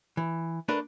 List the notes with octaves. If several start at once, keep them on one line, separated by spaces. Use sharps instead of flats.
E3
A3 D4 A#4 B4